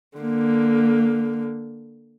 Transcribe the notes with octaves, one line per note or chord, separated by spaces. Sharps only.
D3 A#3